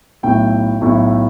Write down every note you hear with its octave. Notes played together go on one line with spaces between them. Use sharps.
B1 A2 A3 E4 G5
B1 A2 A3 E4